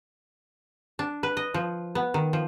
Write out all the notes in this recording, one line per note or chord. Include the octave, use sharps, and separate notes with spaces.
D4
B4
D#5
F3
B3
D#3
F3